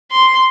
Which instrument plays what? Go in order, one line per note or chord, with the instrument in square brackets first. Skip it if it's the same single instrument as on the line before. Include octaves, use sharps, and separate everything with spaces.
[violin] C6